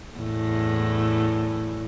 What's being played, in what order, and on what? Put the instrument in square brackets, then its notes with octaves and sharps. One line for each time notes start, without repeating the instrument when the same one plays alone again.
[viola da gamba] E2 A2